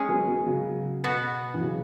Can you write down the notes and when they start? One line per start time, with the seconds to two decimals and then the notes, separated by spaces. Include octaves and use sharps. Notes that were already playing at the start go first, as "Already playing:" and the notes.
Already playing: G#3 C#4 G#4
0.09 F#3 B3
0.28 F#3 B3
0.46 C#3 F#3
1.04 B2 B3 F#4
1.54 E3
1.61 C#3 F#3